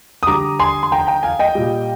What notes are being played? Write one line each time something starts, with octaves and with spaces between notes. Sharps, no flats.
D#6
D3 G3 A#5 D6
G#5 C6
C6
G5 A#5
G5 A#5
F5 G#5
D#5 G5
A#2 G3